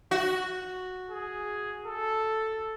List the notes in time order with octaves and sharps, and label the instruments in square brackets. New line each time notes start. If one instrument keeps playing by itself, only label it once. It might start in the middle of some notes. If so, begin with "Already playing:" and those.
[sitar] F#4
[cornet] G#4
A4